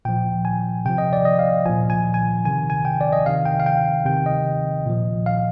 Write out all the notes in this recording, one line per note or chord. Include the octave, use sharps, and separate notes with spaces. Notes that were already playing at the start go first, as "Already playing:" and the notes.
A#2 F3 G5
G#5
C3 F3 G5
D#5
D5
D#5
F5
A#2 F3 G#5
G#5
G#5
C3 D#3 G#5
G#5
G5
D5
D#5
C3 D#3 F5
G5
F5
G5
C3 D#3 G5
D#5
A#2 F3
F5